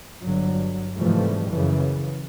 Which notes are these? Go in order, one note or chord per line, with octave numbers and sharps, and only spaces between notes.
G1 D3 F#3
G#2 C3 E3 F3 G3 A3
F#2 C#3 E3